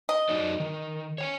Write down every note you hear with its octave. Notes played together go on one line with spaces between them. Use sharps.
D#5
F#3 D#4 D5
D#3
C#5 G5 G#5